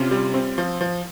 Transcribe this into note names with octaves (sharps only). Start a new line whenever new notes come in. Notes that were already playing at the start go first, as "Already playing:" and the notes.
Already playing: C3 C#4 F4
G3
C4
F3
F3